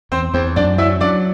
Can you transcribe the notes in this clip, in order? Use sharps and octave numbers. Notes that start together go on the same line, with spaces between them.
E2 C4 C5
E2 C4 C5
F#2 D4 D5
F#3 E4 E5
F#3 D4 D5